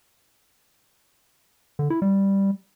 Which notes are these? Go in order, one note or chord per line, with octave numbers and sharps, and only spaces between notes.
D3
E4
G3